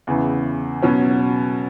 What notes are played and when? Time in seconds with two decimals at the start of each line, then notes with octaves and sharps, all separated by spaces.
0.07 E2 C#3 E3
0.82 B2 F#3 C#4